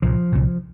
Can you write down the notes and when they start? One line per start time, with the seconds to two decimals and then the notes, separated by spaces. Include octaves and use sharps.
0.02 C2 A#2 F3
0.32 C2 A#2